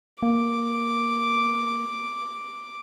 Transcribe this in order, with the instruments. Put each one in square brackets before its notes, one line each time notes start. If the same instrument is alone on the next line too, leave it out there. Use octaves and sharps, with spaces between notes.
[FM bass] A#3 [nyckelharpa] D6